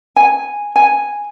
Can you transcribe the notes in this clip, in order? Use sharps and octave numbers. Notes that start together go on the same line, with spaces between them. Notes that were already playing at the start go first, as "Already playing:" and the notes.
G#5
G#5